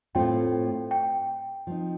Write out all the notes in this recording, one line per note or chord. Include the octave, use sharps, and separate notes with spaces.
A2 A3 C4 F4 G5
G5
F3 C4 D#4